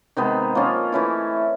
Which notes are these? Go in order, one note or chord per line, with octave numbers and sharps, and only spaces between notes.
C3 D#3 G#3 B3
F3 A#3 C#4 F4
E3 A3 C#4 E4